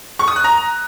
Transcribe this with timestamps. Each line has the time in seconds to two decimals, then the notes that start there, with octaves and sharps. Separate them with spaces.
0.19 C#6
0.28 D#6
0.36 F#6
0.44 A#5